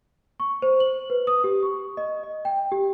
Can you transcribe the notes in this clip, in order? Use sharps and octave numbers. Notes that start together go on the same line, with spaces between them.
C#6
C5
F#7
B4
D#6
G4
C#6
D#5
D#5
G5
G4